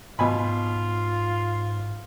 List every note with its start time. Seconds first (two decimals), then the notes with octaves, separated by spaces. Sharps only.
0.19 G#2 B2 F4 G#5 B5